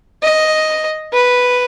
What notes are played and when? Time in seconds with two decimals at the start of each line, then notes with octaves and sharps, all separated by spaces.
0.23 D#5
1.13 B4